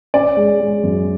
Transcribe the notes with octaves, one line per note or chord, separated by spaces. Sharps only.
C#4 D5
G#3
G#3
F#2